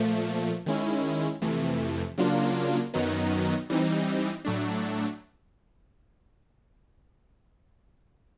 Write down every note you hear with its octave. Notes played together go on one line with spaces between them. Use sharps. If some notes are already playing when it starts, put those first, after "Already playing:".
Already playing: A#2 F3 A3
D#3 G#3 C#4 E4
F2 C3 E3 A3
C#3 F#3 A#3 D4 F4
F#2 D#3 F#3 B3 D#4
E3 G3 C4 D#4
A2 F#3 A3 D4